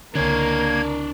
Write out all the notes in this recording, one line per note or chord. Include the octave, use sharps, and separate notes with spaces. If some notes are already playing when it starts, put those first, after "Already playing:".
C#2 D3 A#3 D4 A#4 C#5 G#6